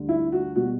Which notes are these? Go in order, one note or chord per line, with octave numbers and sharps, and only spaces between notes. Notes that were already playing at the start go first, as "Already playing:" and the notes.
Already playing: D2 D3 G3
E4
F#4
B2 G3 F#4